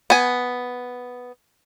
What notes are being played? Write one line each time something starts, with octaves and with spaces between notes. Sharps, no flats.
B3 G#5